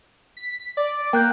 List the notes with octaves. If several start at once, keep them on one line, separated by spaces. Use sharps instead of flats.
B6
D5
A#3 G5 F#6 G6